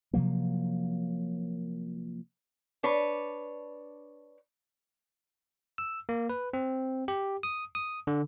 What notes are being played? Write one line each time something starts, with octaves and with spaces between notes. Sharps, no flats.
C3 F3 F#3 A#3
D4 B4 C#5
E6
A#3
B4
C4
G4
D#6
D#6
D3